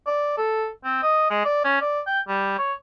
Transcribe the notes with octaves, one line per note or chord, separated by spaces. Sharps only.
D5
A4
C4
D#5
G#3
D5
C#4
D5
G5
G3
C#5